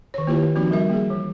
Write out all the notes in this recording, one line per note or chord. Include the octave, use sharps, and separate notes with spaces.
D#3 C#5
A#3 E4 F4 G4 B4
F3 A#3 C4 D#4 F#4
G3 A#4 E5
A#3 G#4
E3